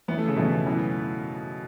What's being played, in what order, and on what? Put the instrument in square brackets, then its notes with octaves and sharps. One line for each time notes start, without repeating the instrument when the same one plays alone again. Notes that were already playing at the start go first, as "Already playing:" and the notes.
[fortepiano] E2 E3 C#4 E4 [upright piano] B3
[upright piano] A3
C#3
[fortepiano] E2 E3 C#4 E4 [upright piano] B2
[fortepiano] F#2 E3 B3